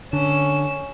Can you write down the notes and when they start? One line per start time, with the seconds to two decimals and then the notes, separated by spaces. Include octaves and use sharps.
0.13 D3 C#4 E7